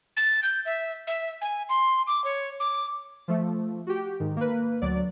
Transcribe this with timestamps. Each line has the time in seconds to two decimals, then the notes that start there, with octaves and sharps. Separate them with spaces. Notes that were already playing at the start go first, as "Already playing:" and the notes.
0.17 A6
0.43 G6
0.65 E5
1.07 E5
1.41 G#5
1.69 C6
2.07 D6
2.24 C#5
2.60 D6
3.28 F3 A3
3.87 F#4 G4
4.20 G#2 D#3
4.37 A#3 B4
4.82 D2 F#3 D5